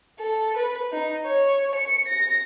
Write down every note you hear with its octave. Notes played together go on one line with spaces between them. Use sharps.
A4
B4
D#4
C#5
C#7
A#6